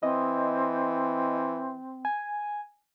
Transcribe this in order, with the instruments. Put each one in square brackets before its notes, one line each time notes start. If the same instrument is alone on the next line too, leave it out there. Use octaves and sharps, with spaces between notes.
[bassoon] E3 [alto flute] C4 [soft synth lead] D#5
[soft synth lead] G#5